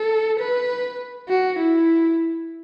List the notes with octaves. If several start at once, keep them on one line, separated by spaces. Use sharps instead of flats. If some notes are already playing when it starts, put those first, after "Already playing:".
Already playing: A4
B4
F#4
E4